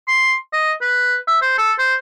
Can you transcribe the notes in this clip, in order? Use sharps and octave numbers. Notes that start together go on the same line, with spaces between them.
C6
D#5
B4
E5
C5
A4
C5